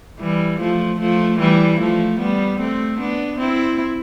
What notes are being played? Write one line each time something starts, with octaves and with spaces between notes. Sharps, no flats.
E3 G3
F3 A3
F3 A3
E3 G3
F3 A3
G3 B3
A3 C4
B3 D4
C4 E4